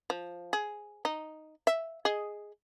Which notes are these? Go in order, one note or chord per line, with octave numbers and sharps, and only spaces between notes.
F3
G#4
D#4
E5
G#4 D#5